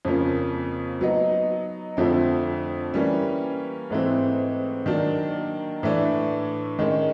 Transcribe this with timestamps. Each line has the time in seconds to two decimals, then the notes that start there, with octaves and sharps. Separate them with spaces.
0.05 F2 C#3 F3 A#3 C#4
1.01 F#3 B3 D#4
1.97 F2 D3 F3 A3 C4
2.94 E3 G3 A#3 C#4
3.90 G#2 E3 A3 C4
4.86 D#3 F#3 A#3 D4
5.83 A2 E3 A3 D4
6.79 D#3 G#3 C#4